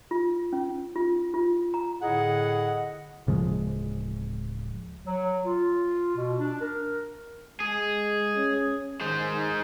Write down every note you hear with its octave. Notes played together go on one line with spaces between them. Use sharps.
F4
C#4
F4
F4
A#5
A2 D3 E4 G#4 D#5 F#5
D1 C#3 F3 G#3
F#3
F4
B2
D4
A#4
G#3 G#4
C#4
D#3 G#3 C5